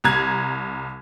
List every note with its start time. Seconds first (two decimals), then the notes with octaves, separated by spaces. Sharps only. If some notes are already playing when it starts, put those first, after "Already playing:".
0.04 C2 A#5 G#6